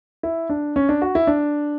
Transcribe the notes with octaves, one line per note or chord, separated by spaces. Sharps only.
E4
D4
C#4
D4
F#4
E4
D4